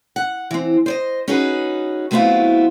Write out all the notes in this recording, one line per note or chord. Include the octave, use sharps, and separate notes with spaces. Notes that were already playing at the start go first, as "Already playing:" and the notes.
F#5
E3 C4
C5 D5 D#5
C#4 D#4 F#4 G#4 B4
F#3 A3 B3 C4 E4 F4